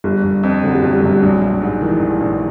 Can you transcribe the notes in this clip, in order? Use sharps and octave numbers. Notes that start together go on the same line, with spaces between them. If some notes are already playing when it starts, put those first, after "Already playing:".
G1 G3
G1
F2
D3 F#3
G3
G1 F#3
G3
G1 F#3
G3
A#1 F#3
A#1
G#2
D#3 E3
A#1
A#1